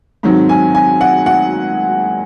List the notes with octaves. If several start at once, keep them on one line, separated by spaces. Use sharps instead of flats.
G#2 D#3 F#3 C4
G#5
G#5
F#5
F#5